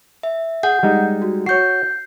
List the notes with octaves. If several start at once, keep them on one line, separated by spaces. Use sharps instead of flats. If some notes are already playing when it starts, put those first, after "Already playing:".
E5
G#4 F#5 G6
G3 G#3 D#4
F#4
F#4 C#5 G6 C7